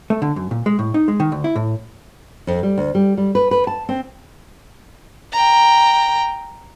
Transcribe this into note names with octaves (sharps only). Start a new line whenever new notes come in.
A3
D3
F#2
A#2
G#3
A2
D#4
G#3
D#3
D2
E4
A2
F2
G3
D2
G3
G3
B4
B4
A5
C4
G5 A#5